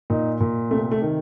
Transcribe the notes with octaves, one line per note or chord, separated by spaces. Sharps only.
A#2 D#4
A#2
C3 A3
A3
D#3